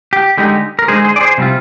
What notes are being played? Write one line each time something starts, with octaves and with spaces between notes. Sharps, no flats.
G4
D3 G#3 D#4 G4
A#4
D3 G#3 D#4 G#4 C5
G#4 C5
D5
G#4 C5
C3 G3 C4 F4